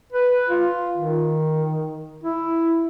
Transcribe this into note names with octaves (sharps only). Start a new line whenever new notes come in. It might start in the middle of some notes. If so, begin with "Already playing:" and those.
B4
F4
D#3
E4